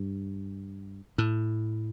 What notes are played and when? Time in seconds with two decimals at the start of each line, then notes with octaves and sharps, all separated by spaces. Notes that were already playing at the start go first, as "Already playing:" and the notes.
Already playing: G2
1.18 A2